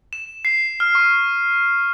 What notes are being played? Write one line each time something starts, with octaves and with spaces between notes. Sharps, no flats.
E7
C7
F6
C#6